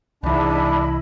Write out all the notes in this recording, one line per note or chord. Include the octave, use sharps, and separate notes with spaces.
C2 G#2 E3 D4 E4 D#5 B5